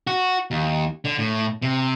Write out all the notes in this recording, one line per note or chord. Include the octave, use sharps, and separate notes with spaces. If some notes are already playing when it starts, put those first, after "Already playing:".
F#4
D#2
D3
A2
C3